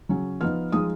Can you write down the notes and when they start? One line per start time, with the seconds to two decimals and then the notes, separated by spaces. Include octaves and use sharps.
0.09 C#3 F#3 C#4
0.41 F3 B3 D#4 F6
0.72 F3 G#3 D#4 D#6